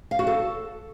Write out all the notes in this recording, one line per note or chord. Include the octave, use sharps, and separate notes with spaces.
F5
F#4
A4